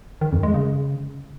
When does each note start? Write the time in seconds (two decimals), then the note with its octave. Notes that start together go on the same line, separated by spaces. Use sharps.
0.21 D#3
0.32 F2
0.43 G#3
0.54 C#3